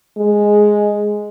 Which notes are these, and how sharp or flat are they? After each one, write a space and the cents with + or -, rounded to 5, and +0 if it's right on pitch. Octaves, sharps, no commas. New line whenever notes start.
G#3 +0